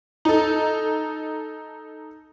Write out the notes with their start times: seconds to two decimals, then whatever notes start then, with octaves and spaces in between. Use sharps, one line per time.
0.25 D#4 A4